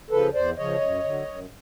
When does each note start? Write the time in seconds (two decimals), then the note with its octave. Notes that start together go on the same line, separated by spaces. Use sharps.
0.10 C#3 F3 A4 B4
0.34 E2 C5 D5
0.58 C#3 F3 C#5 D#5
0.81 F#2
1.04 D3 F#3
1.27 F#2